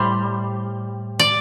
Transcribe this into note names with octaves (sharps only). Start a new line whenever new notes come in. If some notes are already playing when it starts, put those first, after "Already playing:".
Already playing: A2 G3 C5
D5